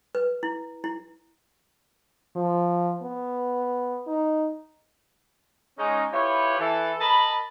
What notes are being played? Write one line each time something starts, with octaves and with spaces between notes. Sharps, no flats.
B4
E4
E4
F3
B3
D#4
G#3 C#4 D#4
E4 F4 G4 B4 C#5
E3 A4
A#4 D#5 A5 B5